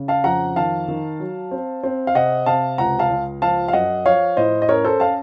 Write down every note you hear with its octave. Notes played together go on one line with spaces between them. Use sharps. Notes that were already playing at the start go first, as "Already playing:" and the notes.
Already playing: C#3
F5 A5
F2 F#5 A#5
D#3 F5 A5
D#3
F#3
C4
C4
F5
C3 D#5 F#5
C3 F5 A5
C#2 F#5 A#5
F5 A5
C#2
F3 F5 A5
F5
F#2 D#5 F#5
F3 C#5 F5
A2 C5 D#5
D#5
C#4 A#4 C#5
A4 C5
C#4 F5 A5